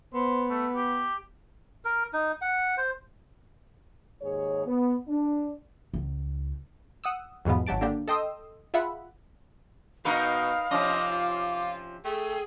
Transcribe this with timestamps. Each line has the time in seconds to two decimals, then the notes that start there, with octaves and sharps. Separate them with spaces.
0.14 B3 C5
0.50 A3
0.75 G4
1.85 A#4
2.13 D#4
2.41 F#5
2.77 C5
4.22 D#2 G#2 G#4 C#5
4.66 B3
5.08 D4
5.94 C#2
7.04 F#5 D#6 E6
7.45 B1 E2 G#2 B2 F3 B3
7.67 G#1 F#3 G4 A5 D7
7.81 D3 A#3 D4 G4
8.08 A4 D#5 G5 C6 D#6 E6
8.74 F4 G#4 E5 F#5 B5
10.05 B2 D#4 A#4 B4 F5
10.71 C3 F3 C#4 D#5 D6
11.11 F4
12.05 A3 G#4 G5